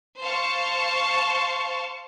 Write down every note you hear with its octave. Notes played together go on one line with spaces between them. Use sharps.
C5 F5 A5 C#6